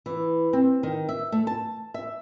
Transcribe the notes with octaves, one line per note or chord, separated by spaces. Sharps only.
E3
C4
D#3
E5
A3
A5
E5